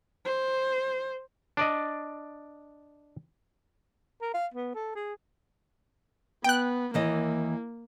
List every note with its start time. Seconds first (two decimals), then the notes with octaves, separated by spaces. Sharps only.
0.25 C5
1.57 D4 D5 D#5
4.21 A#4
4.34 F5
4.54 B3
4.75 A4
4.95 G#4
6.44 B3 G5 F#6
6.94 D#2 E3 A#3 D#5